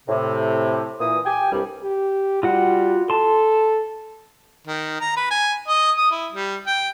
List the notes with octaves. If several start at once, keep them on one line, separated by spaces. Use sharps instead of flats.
A2 C3
A#2 E3 D#6
G4 G5 G#5
C2 G2 G3
G4
G3 F4 F#4 F#5
A4 A5 C6
D#3
A#5
B4
G#5
D#5
D#6
E4
G3
G5